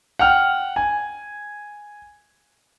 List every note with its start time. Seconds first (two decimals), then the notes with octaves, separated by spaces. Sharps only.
0.19 F#5 G5 F6
0.76 G#5